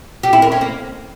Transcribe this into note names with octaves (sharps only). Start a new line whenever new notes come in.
G4
E4
A#4
C#4
A#3